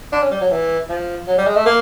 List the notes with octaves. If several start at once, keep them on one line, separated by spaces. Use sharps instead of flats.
D4
C#4
G3
F#3
E3
F3
F#3
G3
G#3
A3
A#3